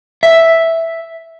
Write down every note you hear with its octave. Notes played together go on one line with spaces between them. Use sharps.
E5